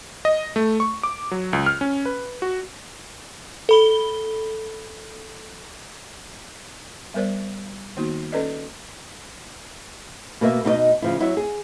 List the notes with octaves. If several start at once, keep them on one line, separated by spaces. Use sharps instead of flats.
D#5
A3
C#6
D6
F#3
C#2
F6
C#4
B4
F#4
A4 B5 G7
G3 B3 A#4 C5 D5
D#3 A#3 B3 D#4 F#4
C#4 A4 B4 D5 D#5
B2 A#3 E5
B2 D#4 D5 D#5
C#3 F3 E4
F#3 E4 E5
G#4